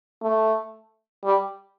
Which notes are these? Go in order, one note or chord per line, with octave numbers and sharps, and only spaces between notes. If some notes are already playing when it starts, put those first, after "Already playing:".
A3
G3